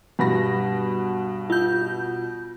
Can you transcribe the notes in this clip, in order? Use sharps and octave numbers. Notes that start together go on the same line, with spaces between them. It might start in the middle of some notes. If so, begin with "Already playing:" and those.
G2 B2 B5 A#6
F4 G6